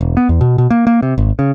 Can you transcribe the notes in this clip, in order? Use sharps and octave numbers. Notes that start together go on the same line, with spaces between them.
E1
B3
E2
B2
B2
A#3
A#3
C3
G#1
C#3